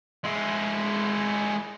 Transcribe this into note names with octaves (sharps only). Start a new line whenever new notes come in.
G#3 E4